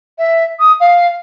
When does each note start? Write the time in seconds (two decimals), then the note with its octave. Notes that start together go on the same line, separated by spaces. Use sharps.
0.18 E5
0.59 D#6
0.80 F5